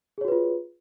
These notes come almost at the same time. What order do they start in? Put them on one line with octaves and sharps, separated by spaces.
G#4 C#5 F#4 B4 F4